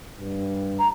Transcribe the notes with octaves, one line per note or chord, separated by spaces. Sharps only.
G2
A#5